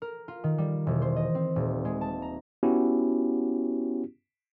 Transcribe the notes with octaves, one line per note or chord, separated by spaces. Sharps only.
A#4
F4
D#3
G3
E1
C5
D#5
C4
D#1
G#3
A5
A#5
B3 C#4 E4 F#4 G4